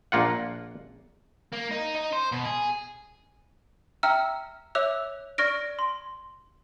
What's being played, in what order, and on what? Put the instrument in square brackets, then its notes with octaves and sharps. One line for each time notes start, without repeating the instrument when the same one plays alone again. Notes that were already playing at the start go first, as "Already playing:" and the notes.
[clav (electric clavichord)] A#1 A#3 F4 F#5
[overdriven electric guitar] A#3
D#4
D#4
C5
B2
G#4
[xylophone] E5 G5 A#5 E6 F6
C#5 E5 D6 E6 F#6 F7
D5 C#6 F6 A#6 D7
C6